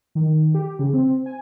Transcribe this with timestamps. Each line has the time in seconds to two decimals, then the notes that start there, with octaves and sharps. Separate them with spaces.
0.15 D#3
0.54 G4
0.79 C#3
0.93 C4
1.26 G#5